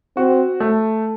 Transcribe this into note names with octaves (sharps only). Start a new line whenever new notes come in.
C4 F#4
A3